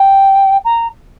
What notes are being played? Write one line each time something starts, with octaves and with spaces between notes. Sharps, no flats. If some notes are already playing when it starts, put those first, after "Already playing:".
Already playing: G5
A#5